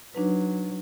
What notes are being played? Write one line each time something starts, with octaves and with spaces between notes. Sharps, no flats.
F#3 D4 D#4 B4